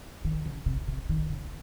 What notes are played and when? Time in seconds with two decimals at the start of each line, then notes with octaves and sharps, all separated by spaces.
0.25 D#3
0.46 C#3
0.66 C3
0.88 C3
1.09 D#3
1.30 C#3